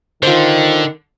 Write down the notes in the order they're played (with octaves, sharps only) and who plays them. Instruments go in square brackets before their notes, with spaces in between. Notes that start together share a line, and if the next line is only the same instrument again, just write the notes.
[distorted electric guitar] D3 [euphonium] D#3 [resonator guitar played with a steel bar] F4 C5